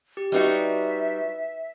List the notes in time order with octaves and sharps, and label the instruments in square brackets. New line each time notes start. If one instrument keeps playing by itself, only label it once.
[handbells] G4
[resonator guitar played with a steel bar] G3 D#4 F#4 [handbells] B4 D5 [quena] E5